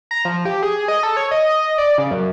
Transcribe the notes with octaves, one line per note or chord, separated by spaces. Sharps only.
A#5
F3
G4
G#4
D#5
A4
C#5
D#5
D5
C#3
F#2